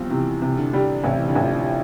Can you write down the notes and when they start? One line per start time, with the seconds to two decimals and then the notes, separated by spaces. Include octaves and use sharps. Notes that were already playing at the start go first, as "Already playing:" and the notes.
Already playing: E2 F3 G3 C4
0.10 C3 E3
0.42 C3
0.57 D3
0.74 G3
1.04 A1 C3
1.17 E3
1.28 D3
1.35 A1
1.40 F3
1.50 E3